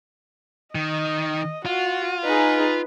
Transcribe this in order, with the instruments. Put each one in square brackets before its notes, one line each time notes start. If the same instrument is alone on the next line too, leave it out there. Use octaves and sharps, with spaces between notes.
[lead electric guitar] D#3 [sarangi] D#5
[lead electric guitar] F4 [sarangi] F#4
[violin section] D#4 G#4 [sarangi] B4